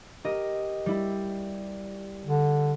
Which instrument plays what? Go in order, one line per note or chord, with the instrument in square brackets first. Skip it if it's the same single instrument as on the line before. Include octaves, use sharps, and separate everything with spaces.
[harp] G4 A#4 D#5
G3 E4
[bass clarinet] D3